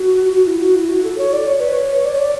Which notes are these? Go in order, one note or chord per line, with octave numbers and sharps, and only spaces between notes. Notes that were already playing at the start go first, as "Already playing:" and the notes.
Already playing: F#4
F#4
E4
F#4
E4
F#4
A4
C#5
D5
C#5
B4
C#5
D5
C#5
D5